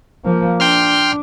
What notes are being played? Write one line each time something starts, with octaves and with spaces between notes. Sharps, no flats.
F3 A#3
D4 G5 C6 F6